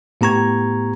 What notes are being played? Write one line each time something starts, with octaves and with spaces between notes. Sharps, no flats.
A2 B3 G4 A#5 C#6 G#6